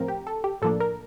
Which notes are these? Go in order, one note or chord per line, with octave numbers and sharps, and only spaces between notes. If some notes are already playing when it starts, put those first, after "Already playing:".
Already playing: A2 F3 C4 A#4
G4
A4
G4
A2 F3 A#3 D4 A4
A#4